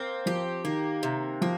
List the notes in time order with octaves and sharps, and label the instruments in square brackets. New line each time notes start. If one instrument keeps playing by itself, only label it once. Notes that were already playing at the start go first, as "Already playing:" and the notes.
Already playing: [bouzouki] A#3 C4
[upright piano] F3 [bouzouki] G4
[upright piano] D#3 [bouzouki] A#3
[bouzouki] C3
[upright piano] F3 [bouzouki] A#3